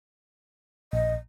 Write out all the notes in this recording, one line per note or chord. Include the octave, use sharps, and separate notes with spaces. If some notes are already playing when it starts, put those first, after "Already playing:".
A#1 D#5